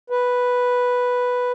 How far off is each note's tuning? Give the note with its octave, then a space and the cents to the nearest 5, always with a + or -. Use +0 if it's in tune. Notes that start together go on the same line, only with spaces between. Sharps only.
B4 +0